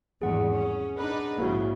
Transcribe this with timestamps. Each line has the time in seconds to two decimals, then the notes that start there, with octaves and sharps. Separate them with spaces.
0.22 G#1 E2 G2 G#4 F#5
0.51 C#4
0.98 D4 D#4 B4
1.38 A#1 G#2 C#3 A#3 E4 F#4